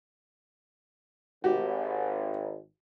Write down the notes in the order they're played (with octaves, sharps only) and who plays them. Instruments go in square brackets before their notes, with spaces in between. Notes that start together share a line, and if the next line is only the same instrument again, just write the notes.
[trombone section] G#1 [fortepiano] F#4 G4